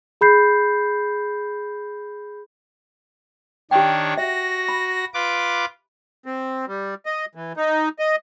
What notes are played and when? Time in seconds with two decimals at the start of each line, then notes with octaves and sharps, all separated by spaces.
0.21 G#4 B5 G6 C7
3.71 D#3 D4 G4 C#5 G5
4.18 F#4 E5 A#6
4.69 B5
5.14 F4 B4 D6
6.26 C4
6.68 G3
7.06 D#5
7.35 E3
7.57 D#4
7.99 D#5